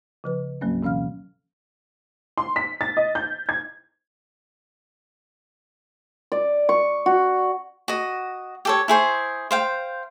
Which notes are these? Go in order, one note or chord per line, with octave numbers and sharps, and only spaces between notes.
C#3 F3 B4
D2 G#2 F#3 A#3 C#4
B2 E3 C#4 F5 F6
C6
B6
A6
D#5
G6
G#6
D5
C#6
F#4
F#4 D#5
G4 A4 C#5
E4 G#4 C5 C#6
C5 F5 G5